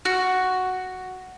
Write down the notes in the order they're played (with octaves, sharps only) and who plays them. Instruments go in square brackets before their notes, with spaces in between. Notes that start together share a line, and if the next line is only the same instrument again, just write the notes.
[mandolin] F#4